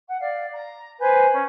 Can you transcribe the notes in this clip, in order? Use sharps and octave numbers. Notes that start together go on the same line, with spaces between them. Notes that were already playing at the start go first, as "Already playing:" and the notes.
F#5
D5 F5
A#5
B4 C5 G#5 G6
C#4